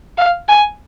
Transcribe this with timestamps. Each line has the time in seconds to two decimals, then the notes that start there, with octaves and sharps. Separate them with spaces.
0.18 F5
0.48 G#5